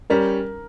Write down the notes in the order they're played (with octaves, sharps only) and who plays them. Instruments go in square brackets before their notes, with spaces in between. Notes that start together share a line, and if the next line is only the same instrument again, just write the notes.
[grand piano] G3 C#4 [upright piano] A#4